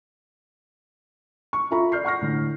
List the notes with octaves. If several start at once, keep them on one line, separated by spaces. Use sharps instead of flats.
C#6
F4 A4 E5 A#5 B5 C#6
D5 F6 G6 C7
F#5 C#6 F6 A#6
A2 D3